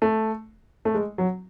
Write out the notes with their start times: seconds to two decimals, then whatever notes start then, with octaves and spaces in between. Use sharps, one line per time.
0.02 A3
0.85 A3
0.94 G#3
1.18 F#3